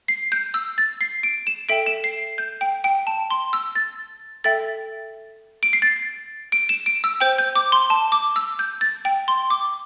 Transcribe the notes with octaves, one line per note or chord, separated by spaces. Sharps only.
C7
G6
E6
A6
C7
D7
E7
A4 E5 G5 D7
E7
C7
G6
G5
G5
A5
C6
E6
A6
A4 E5 G5 A6
D7
C7
A6
D7
E7
D7
E6
C5 G5 G6
G6
D6
C6
A5
D6
E6
G6
A6
G5
C6
D6